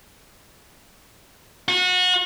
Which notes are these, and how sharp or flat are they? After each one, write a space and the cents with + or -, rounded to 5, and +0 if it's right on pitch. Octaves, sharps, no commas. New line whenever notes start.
F#4 -30